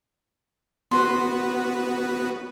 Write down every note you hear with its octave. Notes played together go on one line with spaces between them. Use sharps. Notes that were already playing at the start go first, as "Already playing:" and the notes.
B3 F#4 B4 C6